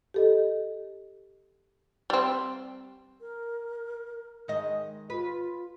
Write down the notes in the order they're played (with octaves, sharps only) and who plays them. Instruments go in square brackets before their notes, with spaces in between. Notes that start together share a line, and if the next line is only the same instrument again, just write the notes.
[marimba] G4 A4 D#5
[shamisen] G3 C4
[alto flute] A#4
[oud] D#3 D#5 [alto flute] G#3
[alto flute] F4 [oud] B4